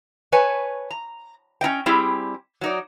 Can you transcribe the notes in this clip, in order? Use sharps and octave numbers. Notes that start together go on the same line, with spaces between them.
B4 C#5 G#5 A5
A#5
C#4 D#4 D#5 G5
G3 C4 E4 G4 G#4
F#3 D#4 D5